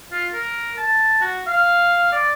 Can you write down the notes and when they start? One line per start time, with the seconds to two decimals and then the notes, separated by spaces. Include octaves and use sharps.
0.12 F4
0.33 A#4
0.78 A5
1.21 F#4
1.47 F5
2.12 D5